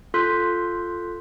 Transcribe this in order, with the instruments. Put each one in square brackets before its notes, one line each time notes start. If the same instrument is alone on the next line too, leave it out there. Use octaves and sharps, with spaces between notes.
[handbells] F4 A4 C6 F#6 G6 B6